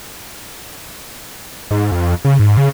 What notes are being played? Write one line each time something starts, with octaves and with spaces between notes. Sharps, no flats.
G#2
F2
C#3
G#2
C#3